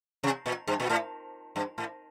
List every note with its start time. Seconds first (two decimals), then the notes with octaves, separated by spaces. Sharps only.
0.23 C3
0.46 A#2
0.68 G2
0.80 A#2
0.89 A2
1.56 G2
1.78 A2